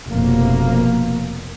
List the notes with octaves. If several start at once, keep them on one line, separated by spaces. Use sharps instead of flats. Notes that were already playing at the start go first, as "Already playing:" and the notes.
F1 B2 A#3